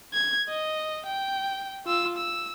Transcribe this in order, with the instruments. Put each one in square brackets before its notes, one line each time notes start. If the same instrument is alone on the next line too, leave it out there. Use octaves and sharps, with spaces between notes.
[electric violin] G#6
D#5
G5
F4 E6
E6